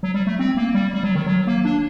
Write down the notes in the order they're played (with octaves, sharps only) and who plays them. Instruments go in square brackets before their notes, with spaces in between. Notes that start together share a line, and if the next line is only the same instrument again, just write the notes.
[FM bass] F#3
G3
A3
C4
A#3
G3
G3
F#3
D#3
F#3
A#3
D4